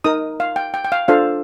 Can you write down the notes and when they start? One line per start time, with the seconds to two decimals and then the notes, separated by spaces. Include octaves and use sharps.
0.04 D#4 A#4 D#6
0.40 F5
0.56 G5
0.74 G5
0.85 G5
0.92 F5
1.08 D4 F4 A4 C5 F5